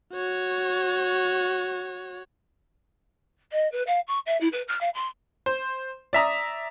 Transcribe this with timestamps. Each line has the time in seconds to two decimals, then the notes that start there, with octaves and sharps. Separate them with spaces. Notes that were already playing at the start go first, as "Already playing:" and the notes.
0.14 F#4 C#5
3.52 D#5
3.72 B4
3.86 F5
4.07 C#6
4.26 E5
4.40 E4
4.52 B4
4.68 F6
4.80 F5
4.94 C6
5.46 C5
6.13 D5 E5 A#5 D#6